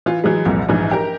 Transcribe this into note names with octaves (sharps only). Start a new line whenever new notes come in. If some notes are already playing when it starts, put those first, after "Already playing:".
E3 F4
E3 F#3 G#3
C2 F2 A#2
A#1 G#2 E3
G4 A#4